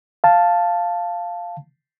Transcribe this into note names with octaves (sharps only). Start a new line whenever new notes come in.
F5 A5